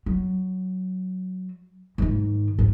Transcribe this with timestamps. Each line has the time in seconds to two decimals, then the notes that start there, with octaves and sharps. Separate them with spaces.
0.06 F#3
1.98 G#2 D#3
2.59 G#2